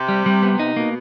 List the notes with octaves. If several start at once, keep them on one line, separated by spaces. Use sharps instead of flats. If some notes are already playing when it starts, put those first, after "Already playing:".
Already playing: C3
G3
G3
B3
D#4
B2 A#3